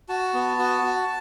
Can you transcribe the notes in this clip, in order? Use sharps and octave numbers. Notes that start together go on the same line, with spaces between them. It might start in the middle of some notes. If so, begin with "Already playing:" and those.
F#4 A5
B3
F#4
F#4